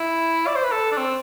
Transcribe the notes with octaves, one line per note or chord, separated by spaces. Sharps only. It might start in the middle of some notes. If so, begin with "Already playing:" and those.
Already playing: E4
D5
C5
B4
A4
D4
C4